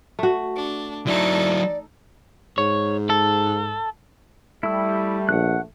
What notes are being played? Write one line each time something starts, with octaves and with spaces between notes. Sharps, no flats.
A3 F#4
D4
F#3 D#4 E4 A4 D5
G#2 C#5
A4
G3 A3 E4 E6
A#1 F#5 F#6